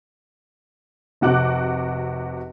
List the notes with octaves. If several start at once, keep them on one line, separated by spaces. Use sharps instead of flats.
F1 C3 F#4 D6 F#6